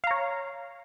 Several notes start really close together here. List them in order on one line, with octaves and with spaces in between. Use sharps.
F5 A#5 C#5